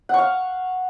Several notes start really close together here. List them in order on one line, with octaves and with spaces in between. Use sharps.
F#5 C#6 F5